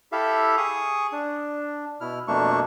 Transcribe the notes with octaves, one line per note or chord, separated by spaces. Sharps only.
E4 G4 A4 E5 F5
G#4 C#6 D#6
D4
B2 E4 F6
F2 B2 A3 A#3 D4 C#6